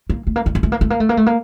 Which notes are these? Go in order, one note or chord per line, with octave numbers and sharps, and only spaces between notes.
A#3
A3
A#3
A3
A#3
A3
A#3
A3
A#3
A3
A#3
A3
A#3